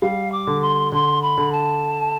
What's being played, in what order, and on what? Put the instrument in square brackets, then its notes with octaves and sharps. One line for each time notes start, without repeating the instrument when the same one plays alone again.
[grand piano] G3 [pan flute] F5
[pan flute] D6
[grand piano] D3
[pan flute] C6
[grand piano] D3 [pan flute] C6
[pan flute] B5
[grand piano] D3
[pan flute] A5